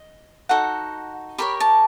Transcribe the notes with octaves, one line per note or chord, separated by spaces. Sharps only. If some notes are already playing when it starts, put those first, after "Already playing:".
Already playing: D#5
D#4 F#4 A4 F#5
G4 A#4 C#5 B5
A5